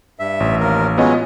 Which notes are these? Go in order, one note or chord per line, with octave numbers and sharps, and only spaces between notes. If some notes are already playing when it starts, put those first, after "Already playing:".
G2 E5
A1
D#2 A#4
F#3 G#3 B3 C#4 F4 D#5